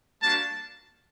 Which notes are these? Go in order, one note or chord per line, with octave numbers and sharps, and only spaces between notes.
G3 A#3 D4 F#4 A5